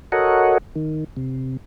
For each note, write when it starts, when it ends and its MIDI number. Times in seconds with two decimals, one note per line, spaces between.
0.12 0.58 66
0.12 0.58 69
0.12 0.58 70
0.12 0.58 73
0.12 0.58 75
0.12 0.58 78
0.76 1.04 51
1.17 1.57 48